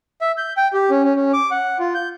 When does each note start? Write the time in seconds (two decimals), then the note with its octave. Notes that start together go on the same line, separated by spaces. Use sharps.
0.21 E5
0.37 G6
0.57 G5
0.73 G4
0.90 C#4
1.04 C#4
1.16 C#4
1.33 D6
1.51 F#5
1.80 F4
1.94 G6